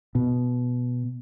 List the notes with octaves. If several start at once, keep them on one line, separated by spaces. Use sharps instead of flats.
B2